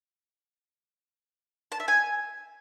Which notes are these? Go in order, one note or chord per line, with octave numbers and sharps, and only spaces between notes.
A5
E5
G#5